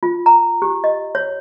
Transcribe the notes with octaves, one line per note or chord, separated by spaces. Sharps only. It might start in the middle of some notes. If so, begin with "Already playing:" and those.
F4
A#5
G4
D#5
C#5